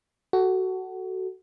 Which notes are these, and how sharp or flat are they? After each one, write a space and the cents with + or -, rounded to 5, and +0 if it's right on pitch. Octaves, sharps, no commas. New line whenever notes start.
F#4 +15 A4 +0